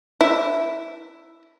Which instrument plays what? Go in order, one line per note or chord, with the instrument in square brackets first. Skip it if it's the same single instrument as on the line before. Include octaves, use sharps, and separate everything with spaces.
[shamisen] E4